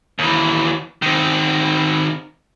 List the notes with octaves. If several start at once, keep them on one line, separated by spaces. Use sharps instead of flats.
D#2 E3
D#3 C4